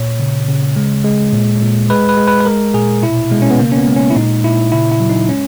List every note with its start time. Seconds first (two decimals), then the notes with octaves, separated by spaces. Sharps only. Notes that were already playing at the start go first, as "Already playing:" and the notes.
Already playing: A#2 C#5
0.20 C#3
0.49 C#3
0.76 G#3
1.04 G#3
1.33 A#2
1.62 A#2
1.90 G#3 B4
2.09 B4
2.17 G#3
2.28 B4
2.40 B4
2.45 G#3 A#4
2.74 A#2 G#4
3.02 B2 E4
3.31 B2 G#3
3.42 C#4
3.51 B3
3.59 C#3 A#3
3.72 C#4
3.78 B3
3.87 G#3
3.96 C#4
4.10 E4
4.16 A#2 D#4
4.44 A#2 E4
4.72 C#3 E4
4.92 E4
5.00 F#3
5.10 D#4
5.29 G#3 C#4